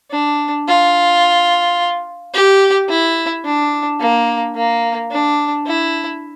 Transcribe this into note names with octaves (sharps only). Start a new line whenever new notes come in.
D4
F4
G4
E4
D4
A#3
A#3
D4
E4